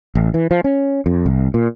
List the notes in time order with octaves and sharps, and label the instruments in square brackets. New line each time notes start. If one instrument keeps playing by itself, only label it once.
[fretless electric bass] A1
E3
F3
C#4
F2
C2
A#2